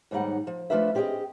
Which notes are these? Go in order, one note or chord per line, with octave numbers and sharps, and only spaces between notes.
D#2 G#2 G3 D#4 F#5
F3
F3 A3 D4 F4 B4 E5
C4 G4 G#4 D5 D#5